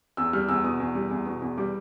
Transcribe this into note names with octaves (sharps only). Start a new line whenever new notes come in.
E2 E6
G3 F6
E2 E6
B2 D#6
E2
G3
E2
B2
E2
G3 D6